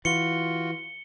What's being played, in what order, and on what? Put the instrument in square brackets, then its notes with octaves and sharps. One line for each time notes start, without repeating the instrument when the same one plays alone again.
[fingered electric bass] E3 [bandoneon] F4 F#4 [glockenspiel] C#7 G7